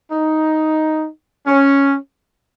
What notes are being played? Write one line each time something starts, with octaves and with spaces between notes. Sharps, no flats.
D#4
C#4